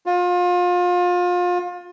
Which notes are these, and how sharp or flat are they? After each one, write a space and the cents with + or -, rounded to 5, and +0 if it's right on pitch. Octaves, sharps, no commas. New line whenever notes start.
F4 +30